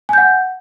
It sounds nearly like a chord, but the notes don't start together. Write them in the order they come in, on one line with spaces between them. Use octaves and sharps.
G#5 G6 F#5